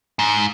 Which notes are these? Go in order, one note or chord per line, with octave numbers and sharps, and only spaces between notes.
G#2